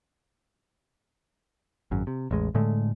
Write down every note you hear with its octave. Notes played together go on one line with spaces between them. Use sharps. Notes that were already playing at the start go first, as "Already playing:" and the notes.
G#1 F#2
C3
A1 E2 G#3
A2 D3 G#3 A3